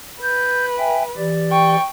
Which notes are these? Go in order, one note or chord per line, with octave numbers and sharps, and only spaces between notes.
B4 G6
E5 G5 G#5
E3 G4 D5
G5 C#6